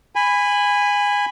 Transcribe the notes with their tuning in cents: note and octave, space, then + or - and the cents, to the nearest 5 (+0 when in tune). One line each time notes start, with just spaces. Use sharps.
G#5 -15 B5 +10